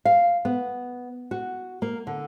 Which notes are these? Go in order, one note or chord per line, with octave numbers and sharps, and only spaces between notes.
F5
B3
F#4
A#3
D3